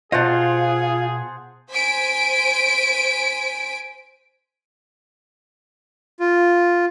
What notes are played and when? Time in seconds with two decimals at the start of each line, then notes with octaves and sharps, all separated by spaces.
0.12 B2 F4 G#4 C5 D#5 F#5 A5
1.70 C5 G#5 B6 D7
6.20 F4